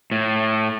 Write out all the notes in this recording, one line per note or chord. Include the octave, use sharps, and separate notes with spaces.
A2